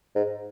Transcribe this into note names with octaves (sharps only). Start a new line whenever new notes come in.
G#2